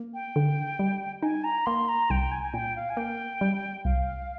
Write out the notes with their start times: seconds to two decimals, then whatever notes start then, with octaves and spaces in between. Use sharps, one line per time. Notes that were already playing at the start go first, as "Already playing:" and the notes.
Already playing: A#3
0.14 G5
0.36 D3
0.79 G3
1.22 D#4 G#5
1.44 A#5
1.66 A#3 C6
1.89 A#5
2.10 C2 G5
2.31 G#5
2.43 G#5
2.54 A#2 G5
2.76 F5
2.90 G#5
2.97 A#3 G5
3.41 G3
3.85 C2 F5